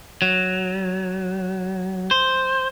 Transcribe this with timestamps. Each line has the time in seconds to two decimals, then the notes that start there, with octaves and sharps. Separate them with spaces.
0.22 F#3
2.11 C5